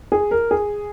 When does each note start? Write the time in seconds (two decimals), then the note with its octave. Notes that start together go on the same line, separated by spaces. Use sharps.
0.12 G#4
0.31 A#4
0.51 G#4